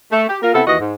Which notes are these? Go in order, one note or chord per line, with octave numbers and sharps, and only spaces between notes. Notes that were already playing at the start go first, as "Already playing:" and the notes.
A3
G4
A#3 F4 A#4
C3 B3 E4 A4
D#2 E3 F#4 D#5
G#2